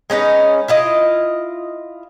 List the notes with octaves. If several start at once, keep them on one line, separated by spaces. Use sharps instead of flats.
G#3 C#4 D#4 B4
E4 F4 D#5